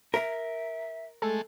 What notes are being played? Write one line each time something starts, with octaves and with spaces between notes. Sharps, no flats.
A#4 E5
G#3 A3 A4